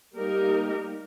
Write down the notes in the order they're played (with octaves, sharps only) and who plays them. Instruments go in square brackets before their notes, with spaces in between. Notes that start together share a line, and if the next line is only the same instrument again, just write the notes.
[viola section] G3 A#3 D#4 G4 A#4